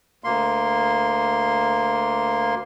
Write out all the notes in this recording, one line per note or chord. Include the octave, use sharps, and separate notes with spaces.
D2 A#3 C6